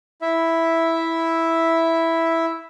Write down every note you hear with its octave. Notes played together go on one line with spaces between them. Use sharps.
E4 E5